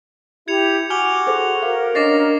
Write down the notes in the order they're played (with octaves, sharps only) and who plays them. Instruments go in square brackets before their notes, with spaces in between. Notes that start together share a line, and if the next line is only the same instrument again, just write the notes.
[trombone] E4 [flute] G4 [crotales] G#6 C#7 F7
[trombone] F#4 [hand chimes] G#5 [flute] D6 [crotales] F6 F7 G7
[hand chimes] G#4 A4 C5
[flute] A#4 [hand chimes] F5
[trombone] C#4 [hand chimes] D4 D#5 A6 [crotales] D6 A#6 C7